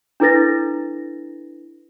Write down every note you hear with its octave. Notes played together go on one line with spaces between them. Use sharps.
D4 E4 A4 B4 A6 A#6